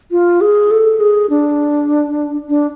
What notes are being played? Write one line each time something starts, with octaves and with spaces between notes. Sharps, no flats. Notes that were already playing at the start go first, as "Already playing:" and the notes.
F4
G#4
A4
G#4
D4
D4